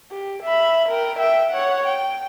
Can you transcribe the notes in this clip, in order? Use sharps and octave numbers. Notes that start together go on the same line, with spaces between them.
G4
E5 B5
A#4 G5
E5 G5
C#5 F#5
G5